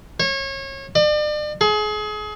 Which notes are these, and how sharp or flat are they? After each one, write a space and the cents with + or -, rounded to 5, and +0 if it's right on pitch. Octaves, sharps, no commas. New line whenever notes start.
C#5 -30
D5 +40
G#4 +30